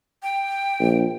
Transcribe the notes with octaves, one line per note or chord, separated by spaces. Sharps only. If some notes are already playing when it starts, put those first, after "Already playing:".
G5
A#1